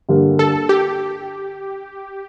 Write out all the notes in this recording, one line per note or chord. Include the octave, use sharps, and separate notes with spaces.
G2 D3 G3 A#3
A4
G4